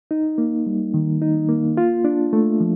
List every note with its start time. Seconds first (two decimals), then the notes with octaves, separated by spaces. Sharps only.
0.11 D#4
0.38 A#3
0.67 G3
0.94 D#3
1.22 D#4
1.49 A#3
1.77 F4
2.05 D4
2.33 A3
2.60 F3